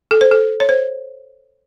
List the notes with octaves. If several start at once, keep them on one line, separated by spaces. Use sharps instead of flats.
A4
C5
A4
C#5
C5